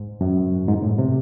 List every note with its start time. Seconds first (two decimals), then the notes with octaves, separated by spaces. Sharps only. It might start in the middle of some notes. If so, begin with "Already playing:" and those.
Already playing: G#2
0.21 F#2
0.68 G#2
0.83 A2
0.98 C3